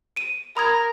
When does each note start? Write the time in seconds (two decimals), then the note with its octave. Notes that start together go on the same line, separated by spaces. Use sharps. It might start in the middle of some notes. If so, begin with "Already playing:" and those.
0.16 D7 D#7
0.57 A#4 B5 D#6 G#6